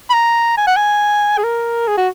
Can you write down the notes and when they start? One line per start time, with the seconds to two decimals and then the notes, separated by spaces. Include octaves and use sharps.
0.10 B5
0.13 A#5
0.57 G#5
0.67 F#5
0.76 G#5
1.37 G#4
1.43 A#4
1.87 G#4
1.97 F#4